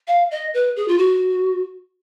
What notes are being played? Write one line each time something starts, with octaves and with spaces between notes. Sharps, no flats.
F5
D#5
B4
G#4
F4
F#4